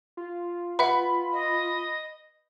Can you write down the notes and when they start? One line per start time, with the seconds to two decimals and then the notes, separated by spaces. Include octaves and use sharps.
0.17 F4
0.79 B4 E5 F#5 B5
1.32 D#5